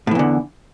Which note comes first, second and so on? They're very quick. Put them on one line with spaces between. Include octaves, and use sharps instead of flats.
A2 E3 E2 D3